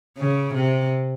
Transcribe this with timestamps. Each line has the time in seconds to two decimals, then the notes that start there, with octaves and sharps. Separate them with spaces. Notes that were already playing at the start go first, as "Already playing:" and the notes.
0.18 C#3
0.54 C3